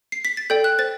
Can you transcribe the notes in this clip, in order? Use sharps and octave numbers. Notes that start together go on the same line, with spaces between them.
C7
B6
A6
A4 D5 G5 G6
F#6
C5 A6